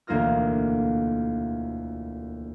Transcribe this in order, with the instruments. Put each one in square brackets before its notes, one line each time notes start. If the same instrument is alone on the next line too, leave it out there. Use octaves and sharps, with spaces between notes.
[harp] E1 D2 A#3 F4 D#5 F6